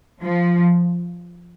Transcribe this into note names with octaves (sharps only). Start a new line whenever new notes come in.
F3